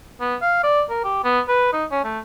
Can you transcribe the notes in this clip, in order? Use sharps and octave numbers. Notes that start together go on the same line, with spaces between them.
B3
F5
D5
A#4
G4
B3
B4
D#4
C#4
A3